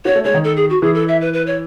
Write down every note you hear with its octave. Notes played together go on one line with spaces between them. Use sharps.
F#4 C#5
A3
G#3 C#5
D#3
A4
G#4
F#4
E3 G#4
A4
E5
B4
B4
C#5